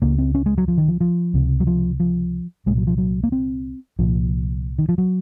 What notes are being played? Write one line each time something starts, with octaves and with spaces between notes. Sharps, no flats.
C#2 C#3 A#3
C4
C#4
G#3
F#3
F3
D#3
F3
F3
C#2 C3
F#3
F3
F3
C2 A#2 G#3
F#3
F3
F#3
A#3
C4
C2 A#2 F3
D#3
F3
F#3